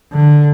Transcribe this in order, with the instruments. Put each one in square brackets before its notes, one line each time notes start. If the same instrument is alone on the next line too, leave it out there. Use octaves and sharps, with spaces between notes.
[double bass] D3